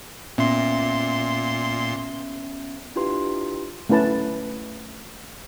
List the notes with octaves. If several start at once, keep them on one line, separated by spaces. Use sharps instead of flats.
A#2 B3 C#4 E5 C6
D4 E4 F4 G4 B4 C6
A3 C#4 E4 B4 A5